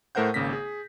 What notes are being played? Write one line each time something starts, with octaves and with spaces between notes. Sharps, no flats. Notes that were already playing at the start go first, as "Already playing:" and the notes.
A2 A3 A#4 C5 F#5 G6
G#1 C#3 A#3 A#6 B6
G#4